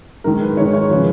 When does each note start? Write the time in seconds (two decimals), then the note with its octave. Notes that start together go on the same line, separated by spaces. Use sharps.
0.24 G#2 D#3 A#4
0.41 B4
0.57 G#2 D#3 C#5
0.73 C#5
0.90 C#3 F3 B4